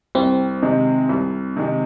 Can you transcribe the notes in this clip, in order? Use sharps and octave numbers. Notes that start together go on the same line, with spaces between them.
C2 C4
C3 D#3 G#3
C2
C3 D#3 G#3